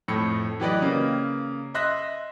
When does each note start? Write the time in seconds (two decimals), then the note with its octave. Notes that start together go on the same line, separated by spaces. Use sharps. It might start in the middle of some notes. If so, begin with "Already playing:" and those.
0.08 F2 A2 A3 C#7
0.60 E3 F#3 G4 B4 D5 D#5
0.82 C#3 A#3
1.74 D#5 E5 C6 F#6 A#6